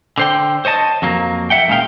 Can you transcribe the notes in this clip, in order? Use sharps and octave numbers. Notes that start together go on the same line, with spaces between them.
D3 C5 G5
C5 C#5 D#5 A5
F2 F#3 A#3
E5 F#5 G5
C#2 A#2 D#3 F5 G5